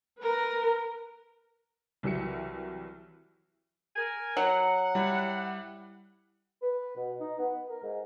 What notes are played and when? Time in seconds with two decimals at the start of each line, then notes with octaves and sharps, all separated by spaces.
0.19 A#4 B4
2.03 C2 E3 F#3 E5 C#7
3.96 A#4 G#5
4.37 F#3 F#5
4.95 G3 E4
6.62 B4
6.96 B2
7.20 D#4
7.38 B3
7.69 A#4
7.82 G#2